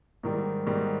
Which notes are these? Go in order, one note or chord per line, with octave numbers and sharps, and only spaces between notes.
G#2 D#3 G3
G#2 D#3 G3